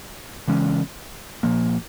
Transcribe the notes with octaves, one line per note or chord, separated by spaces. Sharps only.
C#3 E3 G#3 C#4
A#2 F3 A#3